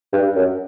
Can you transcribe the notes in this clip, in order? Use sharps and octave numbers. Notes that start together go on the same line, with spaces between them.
G2
F#2